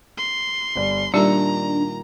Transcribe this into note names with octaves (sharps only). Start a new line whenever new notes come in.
C6
G1 G3
A#2 D#3 G3 D4 D#4 G4 A#5